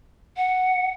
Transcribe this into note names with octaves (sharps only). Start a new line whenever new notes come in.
F#5